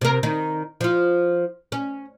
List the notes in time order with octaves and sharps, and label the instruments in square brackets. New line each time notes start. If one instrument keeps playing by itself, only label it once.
[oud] C3 A#4
D#3 D#4
F3 F4
C#4